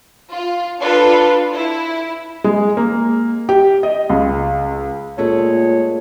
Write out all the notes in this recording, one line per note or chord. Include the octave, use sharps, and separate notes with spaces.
F4
D4 F4 A4 B4
E4
G#3
A#3
G4
D#5
C#2
A#2 G#3 A3 A4 C#5